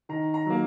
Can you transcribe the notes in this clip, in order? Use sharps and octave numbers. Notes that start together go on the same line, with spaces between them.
D#3 A#5
A#5
F#3 A#3